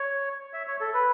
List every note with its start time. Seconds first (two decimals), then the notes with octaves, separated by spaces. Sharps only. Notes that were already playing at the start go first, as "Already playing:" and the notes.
Already playing: C#5
0.53 E5
0.67 C#5
0.81 A4
0.94 B4